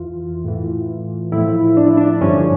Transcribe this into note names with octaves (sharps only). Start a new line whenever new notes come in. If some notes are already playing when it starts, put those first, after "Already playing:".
Already playing: F2 E3 F4
A2 E3
A2 F3 E4
D4
E4
D4
G2 D3 F3 C#4